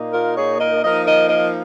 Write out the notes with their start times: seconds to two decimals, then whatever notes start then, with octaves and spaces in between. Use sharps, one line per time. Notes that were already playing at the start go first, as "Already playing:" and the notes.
Already playing: A#2 A#3 D#4
0.13 F4 A#4
0.37 G#4 C#5
0.60 A#4 D#5
0.83 F3 A#3 D#4 A#4 D#5
1.06 A#4 D#5
1.29 A#4 D#5